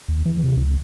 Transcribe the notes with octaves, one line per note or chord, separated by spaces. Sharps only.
D#2
E3
C3
C#2